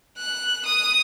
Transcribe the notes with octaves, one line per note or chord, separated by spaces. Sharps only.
F#6
D#6